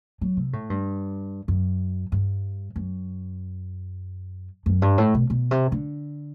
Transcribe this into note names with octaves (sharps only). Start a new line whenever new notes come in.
F#3
C3
A2
G2
F#2
G2
F#2
F#2
G2
A2
B2
B2
C3
D3